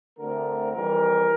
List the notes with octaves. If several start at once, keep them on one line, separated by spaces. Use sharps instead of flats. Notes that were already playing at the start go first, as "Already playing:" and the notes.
D2 D3 A3 C4 A#4
F2 E3 G3 A#4